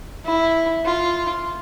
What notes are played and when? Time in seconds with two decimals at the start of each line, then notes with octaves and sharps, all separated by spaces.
0.25 E4
0.85 F4